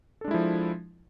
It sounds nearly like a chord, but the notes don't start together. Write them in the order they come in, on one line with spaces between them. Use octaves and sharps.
A4 D4 G#3 E4 F3